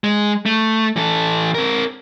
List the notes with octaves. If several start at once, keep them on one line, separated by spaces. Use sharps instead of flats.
G#3
A3
E3 A4
C4 A#4